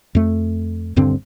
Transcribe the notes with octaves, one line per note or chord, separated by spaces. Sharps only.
F2 A3
D#1 G2 D3 C4